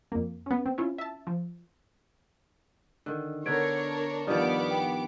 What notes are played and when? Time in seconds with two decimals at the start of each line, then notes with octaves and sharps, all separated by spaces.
0.12 F2 A#3
0.46 B3 C#4
0.66 C4
0.78 C#4 E4 F4
0.98 E5 A5
1.27 F3
3.06 D3 D#3
3.46 D3 B3 D4 A#4 C#5 G#6 D7
4.27 G2 D#3 F3 B3 D5 D6 D#6 F6
4.71 G5